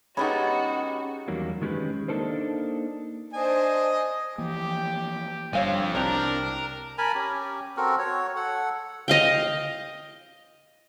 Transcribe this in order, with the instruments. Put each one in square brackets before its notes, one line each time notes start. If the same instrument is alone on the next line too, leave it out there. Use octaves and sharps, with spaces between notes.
[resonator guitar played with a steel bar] G#3 B3 D#4 [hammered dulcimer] C#4 G4 [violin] F#4 [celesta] B5
[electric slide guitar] E2 D#3 F#3 G3 A#3
D#3 G#3 C#4 G4 B4
A#3 D4 D#4 A4 A#4 C5
[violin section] D4 C5 [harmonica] D#5 G#5
[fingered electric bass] E3 F3 A#3 [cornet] G4
[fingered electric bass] G1 G3 [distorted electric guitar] F3 C4 [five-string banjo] C#5 F5 G#5
[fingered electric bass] C2 [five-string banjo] C4 G4 [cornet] D4 [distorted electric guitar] A#4
[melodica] A#4 G#5 A5 B5
C#4 G4
C4 F#4 A4 A#4
F#4 C#5
A4 F#5
[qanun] D#5 F5 G5